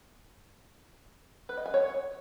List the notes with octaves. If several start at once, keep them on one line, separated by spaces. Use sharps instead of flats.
B4
D#5
G#5
C#5